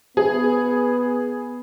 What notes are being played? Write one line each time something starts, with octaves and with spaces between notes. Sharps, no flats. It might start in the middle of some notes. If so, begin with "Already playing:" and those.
B3 G#4